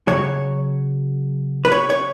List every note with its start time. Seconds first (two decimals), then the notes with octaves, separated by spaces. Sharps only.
0.08 C#3 F#3 C#5
1.65 B4
1.72 C#5
1.90 C#5